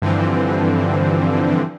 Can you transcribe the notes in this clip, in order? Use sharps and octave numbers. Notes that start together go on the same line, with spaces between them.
G2 D3 E3 F3 C4